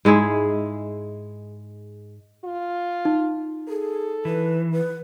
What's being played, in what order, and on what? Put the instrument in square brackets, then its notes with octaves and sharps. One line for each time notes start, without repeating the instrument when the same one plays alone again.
[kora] G#2 G#3 E4 G#4
[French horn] F4
[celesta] D#4
[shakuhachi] G#4 [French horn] A4
[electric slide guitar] E3 [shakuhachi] B4
[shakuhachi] B4